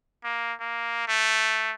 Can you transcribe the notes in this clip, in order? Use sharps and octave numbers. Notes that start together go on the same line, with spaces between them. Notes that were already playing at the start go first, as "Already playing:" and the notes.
A#3
A#3
A3